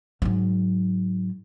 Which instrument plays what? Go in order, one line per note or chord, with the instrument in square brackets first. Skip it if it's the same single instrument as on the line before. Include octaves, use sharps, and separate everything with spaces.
[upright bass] G#2 F#3